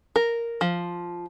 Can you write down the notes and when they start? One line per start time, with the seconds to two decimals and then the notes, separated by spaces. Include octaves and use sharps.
0.16 A#4
0.61 F3